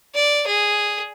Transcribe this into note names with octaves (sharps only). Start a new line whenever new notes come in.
D5
G#4